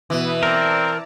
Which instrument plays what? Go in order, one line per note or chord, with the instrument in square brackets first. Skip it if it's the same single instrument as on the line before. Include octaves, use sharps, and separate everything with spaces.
[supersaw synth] B2 B4 D#6 [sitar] E3
[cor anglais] C4 [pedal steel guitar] A#4 [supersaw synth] D5 A5 A#5